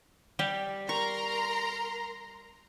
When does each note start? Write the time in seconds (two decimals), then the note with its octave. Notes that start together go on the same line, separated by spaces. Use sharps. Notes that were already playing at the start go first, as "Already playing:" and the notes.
0.39 G3 G4
0.89 A#4 A#5 C6 C#6